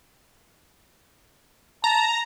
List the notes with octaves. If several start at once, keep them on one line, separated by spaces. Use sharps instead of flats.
A5 A#5